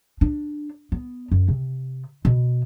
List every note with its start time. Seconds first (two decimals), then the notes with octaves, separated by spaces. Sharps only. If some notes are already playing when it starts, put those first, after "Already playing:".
0.21 D4
0.92 B3
1.31 F#2
1.48 C3
2.25 B2